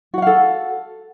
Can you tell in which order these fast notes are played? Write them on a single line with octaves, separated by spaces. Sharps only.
F#4 F#5 F5 A4